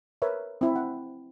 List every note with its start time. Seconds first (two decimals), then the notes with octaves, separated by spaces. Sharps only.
0.22 A#4 B4 C#5 E5
0.61 C4 E4
0.76 F#5